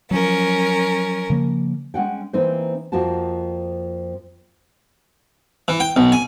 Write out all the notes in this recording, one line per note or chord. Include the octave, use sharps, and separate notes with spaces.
F3 F#3 C#4 A#4
C#3 F3 A#3
G#3 C#4 F#5 G5
E3 A#3 C4 D#4 C5
F2 F3 A#3 F#4 A5
E3
G5
B1
G#5